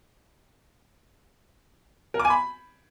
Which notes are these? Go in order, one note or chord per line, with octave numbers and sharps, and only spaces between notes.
A#4
D6
G#5
B5